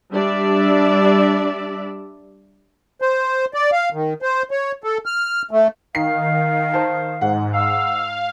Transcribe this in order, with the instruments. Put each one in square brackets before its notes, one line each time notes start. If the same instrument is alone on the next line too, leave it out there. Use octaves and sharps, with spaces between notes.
[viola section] G3 D4 D5 E5
[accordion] C5
D5
F5
D#3
C5
C#5
A4
F6
A3
[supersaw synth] D#3 [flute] F5 [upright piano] C7
[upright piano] C5 A5
[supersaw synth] G#2 [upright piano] F#5
[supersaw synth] F5 [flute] E6